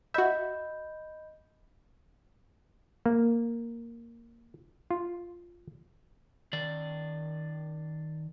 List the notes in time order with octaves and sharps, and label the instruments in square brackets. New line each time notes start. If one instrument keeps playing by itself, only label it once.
[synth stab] F#4 E5 [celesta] D#5 B5 G6
[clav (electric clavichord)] A#3
F4
[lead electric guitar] D#3 D5